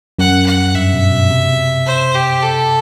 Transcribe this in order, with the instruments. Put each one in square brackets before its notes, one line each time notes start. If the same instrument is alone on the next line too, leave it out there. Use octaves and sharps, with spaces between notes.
[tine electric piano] F#2 [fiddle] F#5
[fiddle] F#5
[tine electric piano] G2 [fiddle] E5
[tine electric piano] B2
B2
C3
[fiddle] C5
G4
A4